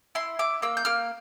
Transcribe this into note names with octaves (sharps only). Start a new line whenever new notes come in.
E4 C6
E4 D6
A#3 E6
G6
A#3 F6